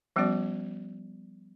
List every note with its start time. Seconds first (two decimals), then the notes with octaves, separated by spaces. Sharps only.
0.16 F3 G3 B3 C#4 F#4 D5